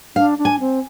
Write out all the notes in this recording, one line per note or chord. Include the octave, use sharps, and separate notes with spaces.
D4 F5
D4
G#5
C4